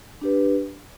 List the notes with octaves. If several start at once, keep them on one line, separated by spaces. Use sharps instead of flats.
D4 G4 B4